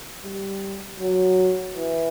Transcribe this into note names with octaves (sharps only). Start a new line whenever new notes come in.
G3
F#3
E3